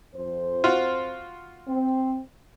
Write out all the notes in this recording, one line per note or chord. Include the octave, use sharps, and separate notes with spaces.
F2 C5
F4 F#4
C4